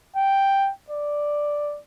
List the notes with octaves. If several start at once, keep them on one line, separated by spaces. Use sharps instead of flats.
G5
D5